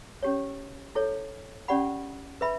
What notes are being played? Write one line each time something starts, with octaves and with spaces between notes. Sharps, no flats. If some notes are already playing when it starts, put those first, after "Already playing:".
C#4 G4 C#5
E4 A4 C#5
C#4 G4 D5 F#5 B5
B4 E5 B5